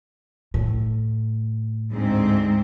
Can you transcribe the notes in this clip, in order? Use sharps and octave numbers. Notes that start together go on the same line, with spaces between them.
A2
D2 G#2 C4